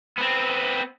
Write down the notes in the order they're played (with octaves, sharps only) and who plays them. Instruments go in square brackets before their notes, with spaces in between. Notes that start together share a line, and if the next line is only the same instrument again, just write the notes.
[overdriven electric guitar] B3 C4